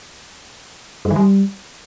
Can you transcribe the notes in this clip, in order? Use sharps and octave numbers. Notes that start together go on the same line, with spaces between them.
G2
D#3
G3